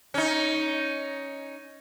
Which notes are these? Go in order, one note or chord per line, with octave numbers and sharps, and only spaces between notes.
C#4 D#4